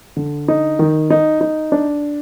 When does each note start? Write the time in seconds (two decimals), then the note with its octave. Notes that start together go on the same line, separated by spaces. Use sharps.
0.17 D3
0.48 D#4
0.79 D#3
1.10 D#4
1.41 D#4
1.72 D4